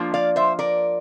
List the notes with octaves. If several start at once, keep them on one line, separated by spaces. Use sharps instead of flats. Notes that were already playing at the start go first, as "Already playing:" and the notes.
Already playing: F3 A#3 D4 F4
D5 F5
C5 E5
A#4 D5